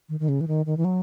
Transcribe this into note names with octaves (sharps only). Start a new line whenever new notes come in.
D#3
D#3
C#3
E3
D#3
D#3
E3
F#3